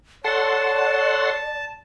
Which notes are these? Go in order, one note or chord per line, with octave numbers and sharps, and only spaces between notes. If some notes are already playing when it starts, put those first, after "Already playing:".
A4 C#5 D5 F#5 A5 C6